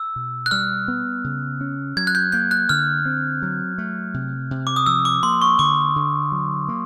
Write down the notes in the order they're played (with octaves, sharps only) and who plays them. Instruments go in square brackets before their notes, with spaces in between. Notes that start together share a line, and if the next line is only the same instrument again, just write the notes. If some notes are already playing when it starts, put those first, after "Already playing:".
Already playing: [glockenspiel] E6
[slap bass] B2
[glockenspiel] F#6
[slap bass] G3 [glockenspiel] F6
[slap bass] B3
C#3
C#4
[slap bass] F#3 [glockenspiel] G#6
[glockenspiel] F#6
G6
[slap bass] A#3 [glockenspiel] G6
[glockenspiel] F#6
[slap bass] D3 [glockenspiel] F6
[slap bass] C4
F#3
A3
C3
C3
[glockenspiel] D6
D#6
[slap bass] F3 [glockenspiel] E6
[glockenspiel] D6
[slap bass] A#3 [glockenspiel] C6
[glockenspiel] C#6
[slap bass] D3 [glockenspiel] D6
[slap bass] D3
F#3
A#3